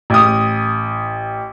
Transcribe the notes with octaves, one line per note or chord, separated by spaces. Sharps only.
A1 D#6